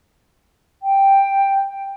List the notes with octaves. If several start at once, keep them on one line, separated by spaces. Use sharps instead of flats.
G5